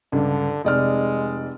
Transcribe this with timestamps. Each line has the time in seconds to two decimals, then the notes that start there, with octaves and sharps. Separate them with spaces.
0.12 C#2 G2 D3
0.64 F1 G#3 D5 F6